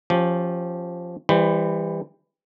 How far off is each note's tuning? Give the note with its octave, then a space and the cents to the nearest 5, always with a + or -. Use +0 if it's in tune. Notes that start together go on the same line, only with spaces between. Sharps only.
F3 +0 C#4 -20 G4 +0
E3 +0 G3 +25 C5 -5